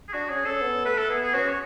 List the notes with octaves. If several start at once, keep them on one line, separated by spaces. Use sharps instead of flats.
G#4
D4 F#4
C#4 G#4
C#4 A4
B3
A3 B4
A4
B3 G#4
G#4
C#4 F#4
C#5